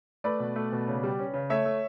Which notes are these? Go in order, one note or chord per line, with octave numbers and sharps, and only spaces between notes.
A3 B4 D5
B2
A3
B2
C#3
G3
C#4
C#3
A3 C#5 E5
A3